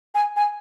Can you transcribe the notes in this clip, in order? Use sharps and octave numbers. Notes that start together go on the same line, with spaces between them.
G#5
G#5